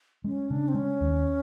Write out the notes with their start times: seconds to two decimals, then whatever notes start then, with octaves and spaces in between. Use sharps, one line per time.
0.24 G#3 C#4
0.50 C#3 D4
0.68 C4
0.74 G#3 C#4
1.01 D#2